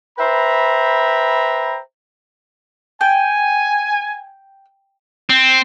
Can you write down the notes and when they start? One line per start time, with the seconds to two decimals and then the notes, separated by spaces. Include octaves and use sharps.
0.19 B4 C5 E5 G5 A#5 B5
3.01 G5 G#5
5.29 C4